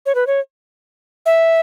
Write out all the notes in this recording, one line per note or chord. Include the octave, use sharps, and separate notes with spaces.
C#5
B4
C#5
E5